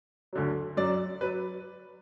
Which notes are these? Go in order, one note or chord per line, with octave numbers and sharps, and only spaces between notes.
D2 D3 F#3
F#2 F#3 D5
F#3 B4